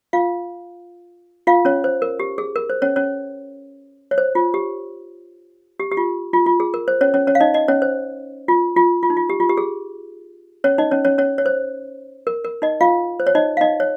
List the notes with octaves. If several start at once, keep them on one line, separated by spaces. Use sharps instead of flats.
F4 F5
F4 F5
C#4 C#5
C5
A#4
G4
G#4
A#4
C5
C#4 C#5
C#4 C#5
C#5
C5
F4
G4
G4
G4
F4
F4
F4
G#4
A#4
C5
C#4 C#5
C#4 C#5
C#4 C#5
F5
D#4 D#5
D#4 D#5
C#4 C#5
C5
F4
F4
F4
D#4
F4
G4
F4
G4
G#4
C#4 C#5
D#4 D#5
C#4 C#5
C#4 C#5
C#4 C#5
C#5
C5
A#4
A#4
D#4 D#5
F4 F5
C5
C#5
D#4 D#5
F5
D#4 D#5
C#5